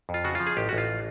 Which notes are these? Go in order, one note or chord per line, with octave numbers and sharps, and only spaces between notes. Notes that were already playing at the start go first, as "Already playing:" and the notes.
F2
F4
C#3 F#4
F3 F4
G#4
A1 G4
F#4
A1
F4